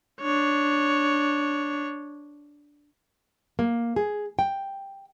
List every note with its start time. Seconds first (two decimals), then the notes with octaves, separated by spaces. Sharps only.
0.21 D4 C#5
3.59 A#3
3.96 G#4
4.39 G5